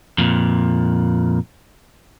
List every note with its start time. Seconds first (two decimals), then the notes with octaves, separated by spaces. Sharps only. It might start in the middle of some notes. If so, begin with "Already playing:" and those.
0.18 F2 A#2